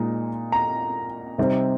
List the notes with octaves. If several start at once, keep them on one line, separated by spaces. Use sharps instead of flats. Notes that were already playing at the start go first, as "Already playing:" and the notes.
Already playing: A#2 G#3 D#4
A#5
C3 G3 C4 D#4